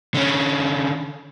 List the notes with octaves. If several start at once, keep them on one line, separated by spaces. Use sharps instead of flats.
D3 C#4